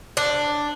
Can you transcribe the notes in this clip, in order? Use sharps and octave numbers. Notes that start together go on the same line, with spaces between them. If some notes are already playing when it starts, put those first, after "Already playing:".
D4